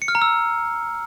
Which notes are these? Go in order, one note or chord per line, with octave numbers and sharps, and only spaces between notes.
C#7
F6
A#5
E6